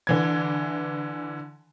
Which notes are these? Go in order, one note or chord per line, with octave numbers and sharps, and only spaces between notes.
D3 E3 G#6